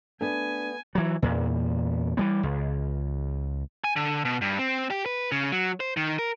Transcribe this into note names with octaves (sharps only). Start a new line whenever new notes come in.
A3 B3 D4 G#5
E3 F#3
E2 A#2
E3 G3 B3
C#2
G#5
D3
B2
G2
C4
G4
B4
C#3
F#3
C5
D#3
A#4